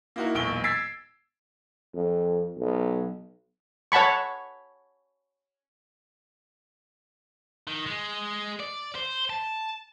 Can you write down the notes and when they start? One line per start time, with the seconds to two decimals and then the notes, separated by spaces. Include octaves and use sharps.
0.16 A#3 D#4 E4 F#4 A#4
0.35 E1 B1 A#2 C#6 D7 G7
0.64 E6 G#6 A6 B6 C7 D7
1.94 F2
2.58 B1
3.92 C#5 F#5 A5 B5 C#6
7.67 D#3
7.86 G#3
8.60 D5
8.95 C5
9.30 A5